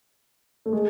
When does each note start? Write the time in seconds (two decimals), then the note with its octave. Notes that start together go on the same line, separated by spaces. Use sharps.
0.66 A3
0.73 G#3